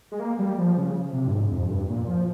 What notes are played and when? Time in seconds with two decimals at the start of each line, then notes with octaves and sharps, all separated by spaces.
0.12 G#3
0.20 A#3
0.39 G3
0.58 F3
0.77 C#3
1.13 C3
1.28 G2
1.33 G#2
1.52 F2
1.69 G2
1.89 A#2
2.07 F3